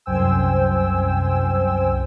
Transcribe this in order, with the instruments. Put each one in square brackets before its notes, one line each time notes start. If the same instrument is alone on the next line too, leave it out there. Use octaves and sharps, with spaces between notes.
[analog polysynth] C2 F#2 C5 G5 G#5 E6